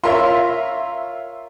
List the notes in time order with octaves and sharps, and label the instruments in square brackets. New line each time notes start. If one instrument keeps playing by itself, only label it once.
[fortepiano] F4 A#4 C#5 [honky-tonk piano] E5 C6